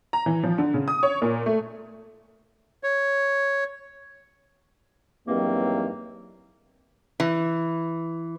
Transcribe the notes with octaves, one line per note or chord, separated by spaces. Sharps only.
A#5
E3
F3
D3
C#3
D#6
C#5
A#2
A3
C#5
E2 G2 D#3 F#3 A#3 C4
E3